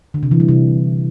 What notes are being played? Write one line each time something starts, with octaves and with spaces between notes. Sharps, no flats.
D3
C3
E3
G3
C3